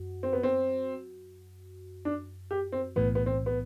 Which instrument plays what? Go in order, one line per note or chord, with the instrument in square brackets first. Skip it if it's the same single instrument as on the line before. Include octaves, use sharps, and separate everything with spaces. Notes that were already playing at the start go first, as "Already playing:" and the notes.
Already playing: [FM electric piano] F#2 F#4
[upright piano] C4
B3
C4
D4
G4
C4
[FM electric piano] B1 A2 E3 [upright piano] B3
[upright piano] B3
C4
B3